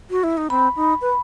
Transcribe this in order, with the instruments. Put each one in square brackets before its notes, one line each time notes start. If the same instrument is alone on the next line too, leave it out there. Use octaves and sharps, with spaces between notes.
[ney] F#4
E4
D#4
[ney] C4 [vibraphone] B5
[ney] D#4
B4